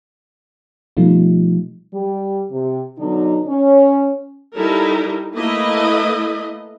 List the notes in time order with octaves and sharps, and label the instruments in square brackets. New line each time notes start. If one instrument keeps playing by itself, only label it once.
[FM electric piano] B2 F3 G3 A3 D#4 F4
[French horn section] G3
C3
B2 D3 F#3 D4 D#4
C#4
[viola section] G3 D#4 E4 A4 A#4
A3 A#3 E4 B4 D#5